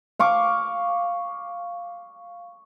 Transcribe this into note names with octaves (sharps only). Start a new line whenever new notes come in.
F5 C#6 D6